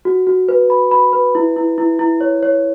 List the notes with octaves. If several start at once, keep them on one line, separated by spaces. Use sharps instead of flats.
F#4
F#4
B4
B5
B5
B4
E4
E4
E4
E4
C#5
C#5